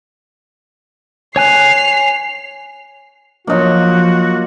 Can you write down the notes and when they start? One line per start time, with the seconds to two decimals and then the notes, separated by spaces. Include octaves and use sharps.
1.36 C#5 G#5 F#6 C7 F7
3.47 F3 F#3 A#3 D4 D#4 F4 F#4